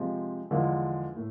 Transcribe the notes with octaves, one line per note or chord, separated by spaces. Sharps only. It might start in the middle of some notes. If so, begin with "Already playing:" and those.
Already playing: C3 F3 G#3
E2 D3 F3 G#3
A2